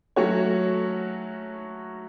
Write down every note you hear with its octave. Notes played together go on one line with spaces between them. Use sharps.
F#3 A3 C#4 F#4 C#5